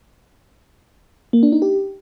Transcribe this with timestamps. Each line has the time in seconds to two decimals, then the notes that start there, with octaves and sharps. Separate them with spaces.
1.33 A#3
1.43 D4
1.52 D#4
1.62 G4